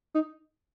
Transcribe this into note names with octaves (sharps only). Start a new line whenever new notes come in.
D#4